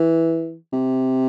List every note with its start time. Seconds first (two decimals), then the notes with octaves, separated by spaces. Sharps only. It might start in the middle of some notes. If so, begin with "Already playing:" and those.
Already playing: E3
0.73 C3